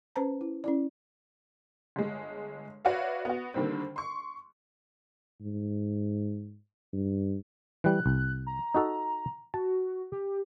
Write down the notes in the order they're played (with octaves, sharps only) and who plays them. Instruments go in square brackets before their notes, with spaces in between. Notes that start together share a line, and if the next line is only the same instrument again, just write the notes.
[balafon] C#4 B4 C5 A5 A#5
E4
C#4 E4 D5
[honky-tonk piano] G1 G#3
F#4 B4 C#5 D5 E5 F5
B3 F#4
D3 D#3 G3 A#3 C4
C6 C#6
[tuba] G#2
G2
[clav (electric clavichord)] E3 G3 [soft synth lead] F#6
[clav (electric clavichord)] C2
[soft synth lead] A#5
[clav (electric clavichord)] D#4 F#4 A4
[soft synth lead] F#4 [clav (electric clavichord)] A5
[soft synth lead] G4